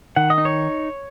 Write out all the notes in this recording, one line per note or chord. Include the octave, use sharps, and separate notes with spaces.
D#3 F#5
D#5
D#4
C#5